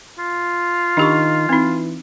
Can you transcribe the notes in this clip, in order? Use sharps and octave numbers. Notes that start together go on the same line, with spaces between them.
F4
D#3 D4 G4 C#6
E3 C4 D#4